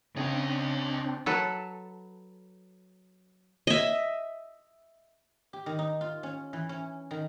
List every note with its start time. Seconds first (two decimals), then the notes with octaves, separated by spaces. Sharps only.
0.17 C#3 C4 D4 C#5 D#5
1.26 F#3 A4 B4
3.67 D#5 E5
5.53 G4
5.66 D#3
5.79 D#4
6.01 F4
6.23 C#4
6.53 E3
6.69 C#4
7.11 D#3